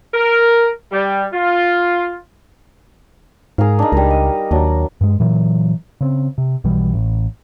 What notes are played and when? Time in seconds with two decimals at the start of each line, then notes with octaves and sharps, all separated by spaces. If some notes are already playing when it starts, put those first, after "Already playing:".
0.14 A#4
0.92 G3
1.33 F4
3.58 G#2 G#4 A#4 F5
3.79 D4 D#4
3.92 C#2 G3 A#4
4.10 D#5
4.51 D#2 F#3 D4
5.01 G2 G#3
5.20 A#2 E3 F#3
6.01 C#3 C4
6.38 C3
6.64 B1 B2 E3 G3
6.94 A1